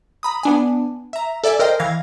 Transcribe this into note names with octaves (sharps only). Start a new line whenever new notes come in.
A#5 B5 D#6
B3 D4 G#5
E5 A#5
A4 D5 E5 G#5
A#4 C5 D#5 G5
E3 F5 G#6 A#6